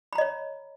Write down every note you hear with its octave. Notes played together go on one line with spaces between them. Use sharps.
C#5 D#5 A#5 B5